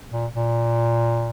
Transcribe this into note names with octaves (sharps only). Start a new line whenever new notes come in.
A#2
A#2